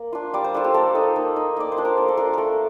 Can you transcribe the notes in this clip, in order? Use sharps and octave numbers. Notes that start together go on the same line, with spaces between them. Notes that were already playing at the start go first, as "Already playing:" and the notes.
Already playing: A#3
D4 F4
G3 D5
C5
D4 F4 A4
G4
A#3 A4
D#4
A#3
D#4
A#3 D5
C5
D4 F4
A#4
A#3 A4
A4
D4 F4 A#4
A3 A4 A#4